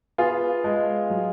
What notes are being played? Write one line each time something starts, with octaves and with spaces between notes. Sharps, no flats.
B3 F4 G#4
G#3
F#3